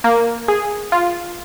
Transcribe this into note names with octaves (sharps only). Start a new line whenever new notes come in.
A#3
G#4
F4